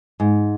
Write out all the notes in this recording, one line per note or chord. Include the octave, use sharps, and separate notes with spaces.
G#2